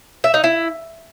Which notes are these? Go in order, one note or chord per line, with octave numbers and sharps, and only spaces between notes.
E5
D#4
E4